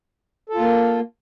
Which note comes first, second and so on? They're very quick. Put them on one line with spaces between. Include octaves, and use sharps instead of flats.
A4 F4 A#3